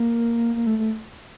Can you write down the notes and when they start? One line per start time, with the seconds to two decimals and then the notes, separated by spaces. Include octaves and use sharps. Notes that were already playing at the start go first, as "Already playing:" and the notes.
Already playing: A#3
0.55 A#3
0.67 A3
0.78 A3